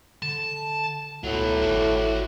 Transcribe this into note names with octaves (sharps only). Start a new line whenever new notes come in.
D3 A5
C#2 A2 F#3 B3
G#1 F#4 D5